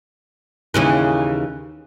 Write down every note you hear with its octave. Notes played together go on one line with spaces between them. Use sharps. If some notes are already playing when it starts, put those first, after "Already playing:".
D#2 C#3 E3